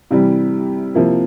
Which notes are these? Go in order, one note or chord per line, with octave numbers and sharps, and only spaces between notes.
C3 E3 G3
C3 F3 A#3 E4